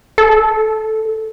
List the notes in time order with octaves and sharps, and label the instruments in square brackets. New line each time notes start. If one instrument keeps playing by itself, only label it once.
[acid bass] A4